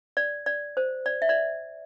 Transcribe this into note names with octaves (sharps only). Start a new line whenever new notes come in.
D5
D5
C5
D5
E5
D5